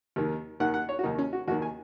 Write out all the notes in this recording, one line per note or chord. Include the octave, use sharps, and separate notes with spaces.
D#2 D#3
D#2 D#3 F#5
F#5
C#5
F#4
D#2 D#3 D#4
C#4
F#4
D#2 D#3 F#4
G#5